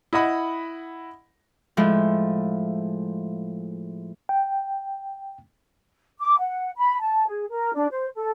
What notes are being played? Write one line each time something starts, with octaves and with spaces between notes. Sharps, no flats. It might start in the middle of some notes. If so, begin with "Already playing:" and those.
E4 D#5 F#5 B5
A2 F3 G#3
G5
D6
F#5
B5
A5
G#4
A#4
D4
C5
A4